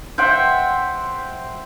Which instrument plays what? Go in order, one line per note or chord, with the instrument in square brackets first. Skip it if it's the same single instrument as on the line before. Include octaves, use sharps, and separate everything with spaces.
[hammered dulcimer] C5 E5 F#5 G5